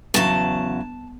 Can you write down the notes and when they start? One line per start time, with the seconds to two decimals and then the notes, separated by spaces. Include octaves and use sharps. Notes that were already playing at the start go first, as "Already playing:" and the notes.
0.14 E2 C#3 F#3 A5